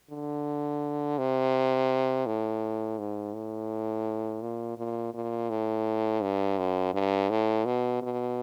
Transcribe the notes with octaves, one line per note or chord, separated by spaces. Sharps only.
D3
C3
A2
G#2
A2
A#2
A#2
A#2
A2
G2
F#2
G2
A2
B2
B2